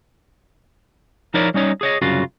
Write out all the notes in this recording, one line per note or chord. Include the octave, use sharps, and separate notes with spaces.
F3 D#4 E4 A#4 C#5 D5
G3 C#4 D#4 C#5
G#4 C#5 D#5
C2 F#2 C#3 F4 F#4